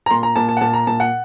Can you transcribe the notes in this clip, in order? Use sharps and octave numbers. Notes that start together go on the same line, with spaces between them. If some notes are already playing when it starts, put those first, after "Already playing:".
A#5
A#2 C6
A#5
A#2 A5
A5
F#5
A#2 A5
A#5
A#2 A5
F#5